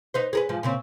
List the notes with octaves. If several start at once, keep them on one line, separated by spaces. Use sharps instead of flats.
D#4 B4 C5
G#4 A#4 B4
G#2 F3
A#2 C#3 C4